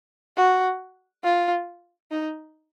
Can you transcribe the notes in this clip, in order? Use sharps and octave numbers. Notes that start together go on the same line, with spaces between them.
F#4
F4
D#4